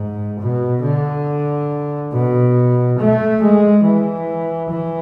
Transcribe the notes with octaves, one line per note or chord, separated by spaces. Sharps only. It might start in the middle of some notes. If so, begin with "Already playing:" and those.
Already playing: G#2
B2
D3
B2
A3
G#3
E3
E3